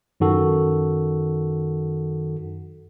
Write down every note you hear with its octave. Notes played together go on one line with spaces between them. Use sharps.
F#2 D#3 F#4 A4